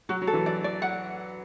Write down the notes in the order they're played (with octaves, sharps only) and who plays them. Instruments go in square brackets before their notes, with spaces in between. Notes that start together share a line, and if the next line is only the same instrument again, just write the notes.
[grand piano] F#3 [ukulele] F#4
[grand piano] F#3
[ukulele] A4
[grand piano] E3
[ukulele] D5
D5
F#5